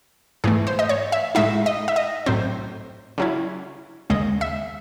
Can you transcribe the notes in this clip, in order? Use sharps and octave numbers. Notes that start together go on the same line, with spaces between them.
G#2 E3 A3 G#4
C5
D#5
C#5
E5
A2 G#3 D#4 E5
D#5
E5
D#5
A2 F#3 C4 C5
C#3 F#3 C#4 E4
D#2 C#3 G#3 D#5
E5